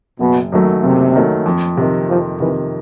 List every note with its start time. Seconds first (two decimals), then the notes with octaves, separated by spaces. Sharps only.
0.20 F#1 B2
0.52 F#2 D#3 F#3 A3
0.83 F#1 C3
1.15 F#2 D#3 F#3 A3
1.46 F2
1.77 C3 D#3
2.09 F2 F3
2.40 C3 D#3 E3